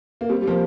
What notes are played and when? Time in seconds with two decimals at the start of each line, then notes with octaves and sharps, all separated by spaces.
0.21 A#3
0.29 G3 C4
0.42 G3
0.47 F3 A#3